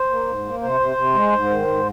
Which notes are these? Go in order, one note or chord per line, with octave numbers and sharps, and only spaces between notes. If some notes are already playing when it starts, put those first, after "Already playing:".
Already playing: C5
A#3
G#2
A#3
C3 C5
C3
C3
G#3
G#2
D#3
G#2